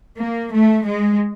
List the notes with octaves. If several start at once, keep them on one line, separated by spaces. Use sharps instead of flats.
A#3
A3
G#3